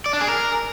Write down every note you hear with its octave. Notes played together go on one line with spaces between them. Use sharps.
D5
D4
G#4
A#4